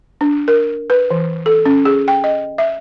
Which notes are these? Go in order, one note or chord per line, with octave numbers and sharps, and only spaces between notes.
D4
A#4
B4
E3
A4
C#4
G#4
G5
D#5
E5